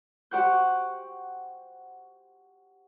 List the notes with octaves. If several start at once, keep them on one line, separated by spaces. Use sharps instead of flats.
G4 C5 F#5 C#6 G6